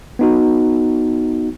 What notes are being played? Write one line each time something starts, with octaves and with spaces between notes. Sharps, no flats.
B3 D#4 F#4